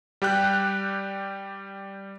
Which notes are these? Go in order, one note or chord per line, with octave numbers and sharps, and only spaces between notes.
G3 G4 G5 F#6